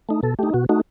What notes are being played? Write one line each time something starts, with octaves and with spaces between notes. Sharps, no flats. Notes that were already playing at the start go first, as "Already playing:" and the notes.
A3 D#4
B2 A4
A3 D#4 G4
B2 F#4
A3 D#4 F#4